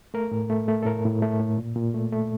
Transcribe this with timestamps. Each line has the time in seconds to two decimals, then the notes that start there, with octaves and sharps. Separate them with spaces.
0.14 A3 A#4
0.31 A2
0.50 A3
0.68 A3
0.83 A4
0.86 A2 A#4
1.05 A2
1.22 A3
1.40 A2
1.58 A#2
1.76 A#2
1.94 A3
2.12 A3